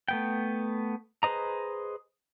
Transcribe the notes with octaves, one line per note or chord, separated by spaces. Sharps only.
A3 B3 G5
G#4 B4 C5 D#5 A#5